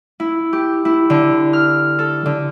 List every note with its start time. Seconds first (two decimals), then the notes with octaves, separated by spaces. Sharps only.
0.20 E4
0.53 G4
0.85 E4
1.10 D3
1.53 F6
1.99 A4
2.26 D3